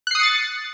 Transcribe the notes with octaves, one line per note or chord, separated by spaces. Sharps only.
D#6 F#6 A6 C7 C#7